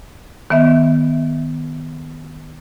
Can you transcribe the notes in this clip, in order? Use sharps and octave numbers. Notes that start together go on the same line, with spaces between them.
D#3 B3 E5